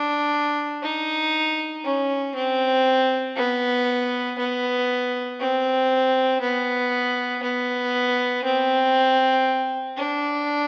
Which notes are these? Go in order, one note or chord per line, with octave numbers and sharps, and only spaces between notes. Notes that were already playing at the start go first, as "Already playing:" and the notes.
Already playing: D4
D#4
C#4
C4
B3
B3
C4
B3
B3
C4
D4